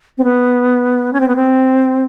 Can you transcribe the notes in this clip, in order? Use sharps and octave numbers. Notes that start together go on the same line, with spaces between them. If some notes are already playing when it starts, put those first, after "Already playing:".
C4
B3
C#4
C4
B3
C4